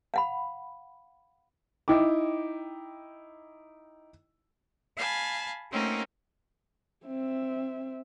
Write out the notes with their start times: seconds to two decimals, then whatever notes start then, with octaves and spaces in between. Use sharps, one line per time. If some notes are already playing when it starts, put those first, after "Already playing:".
0.14 F5 F#5 B5
1.88 D#4 E4 G5 D6
4.97 F5 G#5 A5 B5
5.71 A3 A#3 C4 C#4 D#4 F#4
7.05 C4 E5